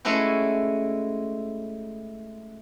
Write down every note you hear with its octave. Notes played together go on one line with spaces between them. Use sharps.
G#3 A3 C#4 E4 F#4